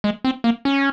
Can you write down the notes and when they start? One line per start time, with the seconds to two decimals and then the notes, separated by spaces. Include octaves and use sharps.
0.04 G#3
0.24 C4
0.44 A#3
0.65 C#4